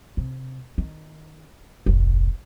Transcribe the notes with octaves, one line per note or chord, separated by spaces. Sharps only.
C3
D#3
F1 A#1